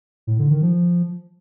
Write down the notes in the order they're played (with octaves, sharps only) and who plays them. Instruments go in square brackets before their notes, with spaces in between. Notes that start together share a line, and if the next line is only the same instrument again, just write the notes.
[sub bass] A2
D3
D#3
F3